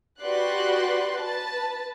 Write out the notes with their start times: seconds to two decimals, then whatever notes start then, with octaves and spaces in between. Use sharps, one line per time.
0.22 F#4 G4 B4 D5 C6 F#6
1.21 B4 A5